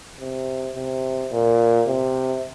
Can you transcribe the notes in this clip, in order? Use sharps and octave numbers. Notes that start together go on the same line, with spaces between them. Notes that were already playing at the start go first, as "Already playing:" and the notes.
C3
C3
A#2
C3